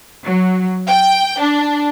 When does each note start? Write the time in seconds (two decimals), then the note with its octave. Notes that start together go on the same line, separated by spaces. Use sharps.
0.24 F#3
0.88 G5
1.40 D4